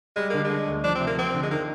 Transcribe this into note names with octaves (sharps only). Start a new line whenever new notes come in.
G3 G#3
D3 A#3
G#3
D3
D2
F3 D4
C3 C4
A#3
F3 C4
D3
G#3
D#3 A#3